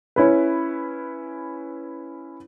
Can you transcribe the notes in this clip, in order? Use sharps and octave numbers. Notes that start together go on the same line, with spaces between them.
C#4 E4 B4